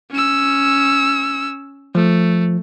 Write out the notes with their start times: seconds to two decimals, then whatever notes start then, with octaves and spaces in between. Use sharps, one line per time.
0.11 C#4 E6
1.95 F3 A3